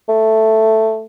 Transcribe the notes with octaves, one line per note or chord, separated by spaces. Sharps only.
A3